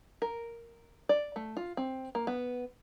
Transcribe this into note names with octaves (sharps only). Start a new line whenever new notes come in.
A#4
D5
A3
F4
C4
A#3
B3